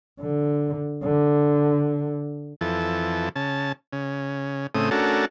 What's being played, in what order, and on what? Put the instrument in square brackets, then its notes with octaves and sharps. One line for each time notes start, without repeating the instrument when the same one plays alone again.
[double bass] D3
D3
[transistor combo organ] F2 E3 A4
C#3 A5
C#3
A2 C#3 A3 C4 D#6
A3 C#4 D4 F#4 A4 A#4